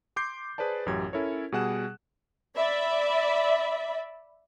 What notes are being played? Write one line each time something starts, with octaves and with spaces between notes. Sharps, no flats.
C6 D6 G6 C7
G#4 B4 C5 D5 A5
A1 F#2 G4 G#6
C#4 E4 A4 A#4 C#5
B2 G3 G#4 F#5 F#6 E7
D5 E5 B5